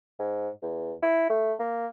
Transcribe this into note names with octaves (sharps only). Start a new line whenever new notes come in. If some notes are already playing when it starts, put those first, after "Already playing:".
G#2
E2
E4
A3
A#3